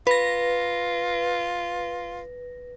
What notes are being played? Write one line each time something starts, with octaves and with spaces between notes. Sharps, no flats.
F4 B4 A#6